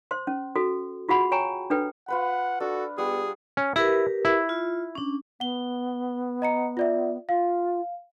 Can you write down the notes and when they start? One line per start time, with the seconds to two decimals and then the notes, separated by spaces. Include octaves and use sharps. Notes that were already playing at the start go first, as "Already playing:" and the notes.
0.11 C5 C6
0.27 C#4
0.56 F#4 A4
1.09 F4 F#4 G#4 F#5 B5
1.32 C#5 G5 G#5 A#5 C#6
1.70 D4 A4 B4 G5
2.08 F4 B4 F#5 B5
2.60 D4 F#4 A4
2.98 G3 B3 F4 G#4 F#5
3.57 C#4
3.76 E4 G4 A#4 B4
4.25 E4
4.49 F4
4.95 C#4 D4
5.40 B3 F#5 G7
6.42 D#5 A#5 C#7
6.77 F4 D5 E5
7.29 F4 F5